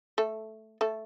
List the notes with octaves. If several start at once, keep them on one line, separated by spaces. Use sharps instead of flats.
A3 A4
A3 A4